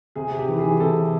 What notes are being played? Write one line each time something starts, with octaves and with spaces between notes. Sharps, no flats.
C3 G#4
C3
G4
E3
G#4
E3
C3 A4
C3